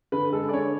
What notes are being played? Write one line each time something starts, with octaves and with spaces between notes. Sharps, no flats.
D3 B4
G#3 A4
D5
D3 C#5